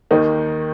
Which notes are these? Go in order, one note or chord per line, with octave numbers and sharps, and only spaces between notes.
D#2 D#3 A#3 D#4